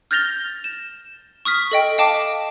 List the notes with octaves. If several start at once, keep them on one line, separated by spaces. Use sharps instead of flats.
F6 G6 A6 A#6 F7 G7
E7
C#6 D#6 F6 B6
A4 D#5 G5
D#5 F5 G5 A5 D6